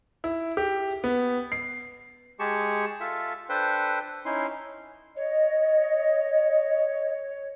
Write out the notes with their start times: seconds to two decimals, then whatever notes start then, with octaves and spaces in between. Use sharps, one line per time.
0.24 E4
0.57 G4
1.04 B3
1.52 C7
2.40 G#3 G4 G#4 A5 C#6
3.00 F4 A4 E5
3.49 D4 A4 B4 C5 G5
4.25 C#4 D#4 E4 C6
5.16 C#5 D#5